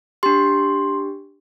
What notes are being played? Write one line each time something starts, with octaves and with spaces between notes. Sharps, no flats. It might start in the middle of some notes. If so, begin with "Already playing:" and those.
D4 G4 C6